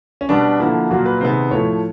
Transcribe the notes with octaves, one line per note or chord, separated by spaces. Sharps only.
C#4
B2 G3 B3 D4
D3 F3 A#3 E4
A#2 F#3 A#3 F#4
B4
C3 D#3 G#3 B3 C5
A2 F3 A3 C#5